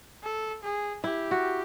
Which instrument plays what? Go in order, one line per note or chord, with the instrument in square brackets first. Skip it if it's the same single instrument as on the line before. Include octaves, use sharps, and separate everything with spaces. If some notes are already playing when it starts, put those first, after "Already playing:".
[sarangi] A4
G#4
[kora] E4 [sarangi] G4
[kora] F#4